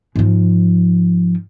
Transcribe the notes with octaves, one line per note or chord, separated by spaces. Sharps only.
G#2 F3